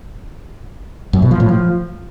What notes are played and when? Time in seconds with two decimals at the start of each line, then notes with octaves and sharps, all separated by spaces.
1.13 F#2
1.22 B2
1.31 F3
1.40 A2
1.49 F3